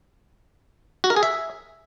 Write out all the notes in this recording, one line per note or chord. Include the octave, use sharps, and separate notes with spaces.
F#4
A#4
G#4
E5